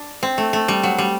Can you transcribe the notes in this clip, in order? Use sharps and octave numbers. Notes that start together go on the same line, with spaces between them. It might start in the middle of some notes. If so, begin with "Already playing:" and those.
Already playing: D4
C4
A3
A3
G3
F#3
G3